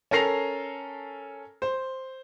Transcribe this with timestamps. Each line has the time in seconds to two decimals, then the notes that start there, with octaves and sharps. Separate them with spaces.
0.11 C#4 A4 A#4 A#6 C7 F7
1.62 C5